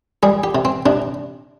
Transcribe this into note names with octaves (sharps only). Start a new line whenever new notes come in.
G3 G#4
G4
C3
C4
C3 D4